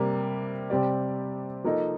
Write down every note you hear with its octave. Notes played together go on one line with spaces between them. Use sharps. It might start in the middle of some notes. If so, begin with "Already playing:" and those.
Already playing: C3 G3 A#3
C3 G3 C4 G4 D5
F3 A#3 D#4 A4 D#5